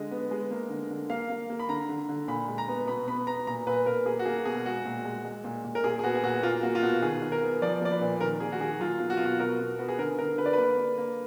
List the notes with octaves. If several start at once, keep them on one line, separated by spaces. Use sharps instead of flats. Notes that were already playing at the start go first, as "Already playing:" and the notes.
Already playing: D3 G#3 D#5
B3
G#3
A#3
D3
D3
A#3 F5
A#3
A#3
B5
D3 A#5
D3
D3
A#2 B5
G#3
A#5
B3
B2 B5
B3 B5
B3 A#5
A#2 A#5
A#2 B4
A#2 A#4
A#3 G#4
F#4
A#3 G#4
B2 G#4
G#3 F#4
A#2
G#3
G#3
A#2
A#2
A#4
A#2 G#4
G#4
B3 F#4
G#4
A#2 F#4
A#3 F4
A#3 F#4
F4
B2 F#4
D#3 G#4
D#3
A#4
B3
F3 D5
A#3 D5
B4
A#2
D#3 A#4
A#3 G#4
F#4
D#3 G#4
F#3 F4
B2
F#4
F4
B2
F#4
B2 A#4
B2
B3 F#4
G#4
D3 A#4
D3 A#4
D3 B4
D5
A#3 B4
A#3
A#3